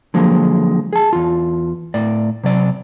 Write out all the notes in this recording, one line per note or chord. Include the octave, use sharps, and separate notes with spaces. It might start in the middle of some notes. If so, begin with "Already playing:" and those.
D3 F3 F#3 G#3 A#3
G#4 A5
E2 F4
A2 D5
C3 F#3 D5